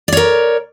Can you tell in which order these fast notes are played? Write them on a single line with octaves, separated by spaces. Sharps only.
D5 C#5 A#4